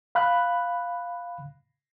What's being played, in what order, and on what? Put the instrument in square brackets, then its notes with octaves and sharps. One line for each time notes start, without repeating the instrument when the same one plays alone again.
[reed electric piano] F5 B5 F#6